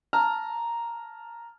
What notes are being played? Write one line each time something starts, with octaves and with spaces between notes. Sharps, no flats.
A5 A#5 F6